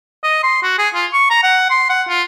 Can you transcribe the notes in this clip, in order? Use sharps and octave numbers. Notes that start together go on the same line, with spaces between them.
D#5
C6
F#4
G#4
F4
C#6
A#5
F#5
C6
F#5
F4